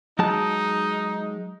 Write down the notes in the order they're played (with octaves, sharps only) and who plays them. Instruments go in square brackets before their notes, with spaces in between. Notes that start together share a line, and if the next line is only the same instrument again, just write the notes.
[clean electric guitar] F#3 G#3 A5 [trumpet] D#4